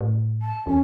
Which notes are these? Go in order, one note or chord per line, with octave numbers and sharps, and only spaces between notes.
A2
A5
E2 C#4